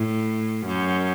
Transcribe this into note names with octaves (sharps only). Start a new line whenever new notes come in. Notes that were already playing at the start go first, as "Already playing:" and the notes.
Already playing: A2
F#2